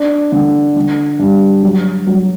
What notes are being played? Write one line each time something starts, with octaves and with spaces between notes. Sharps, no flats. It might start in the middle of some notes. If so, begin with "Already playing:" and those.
Already playing: D4
D3
D3
G2
F#3
F#3